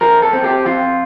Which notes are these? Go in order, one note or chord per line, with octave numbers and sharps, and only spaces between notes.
F3 A#4
A4
C4
G4
F2 F4